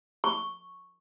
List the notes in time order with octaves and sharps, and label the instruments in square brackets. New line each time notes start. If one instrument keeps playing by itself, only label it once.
[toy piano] C#6